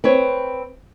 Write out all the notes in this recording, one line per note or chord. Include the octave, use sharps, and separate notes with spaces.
C4 B4 C#5